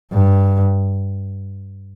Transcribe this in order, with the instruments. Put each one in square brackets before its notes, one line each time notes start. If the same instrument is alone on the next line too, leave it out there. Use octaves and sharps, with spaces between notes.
[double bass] G2